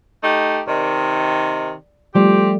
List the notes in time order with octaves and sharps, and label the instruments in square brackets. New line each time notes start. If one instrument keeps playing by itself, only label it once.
[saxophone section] A3 D#4 G4
[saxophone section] C3 D#3 [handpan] D5
[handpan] F3 G3 A3 [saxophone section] C4 G4